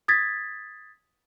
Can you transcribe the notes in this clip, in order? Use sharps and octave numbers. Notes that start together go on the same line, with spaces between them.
D#6 G#6 A6 B6